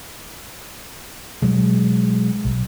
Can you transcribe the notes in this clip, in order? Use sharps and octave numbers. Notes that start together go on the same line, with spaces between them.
B2 F#3 G#3
B1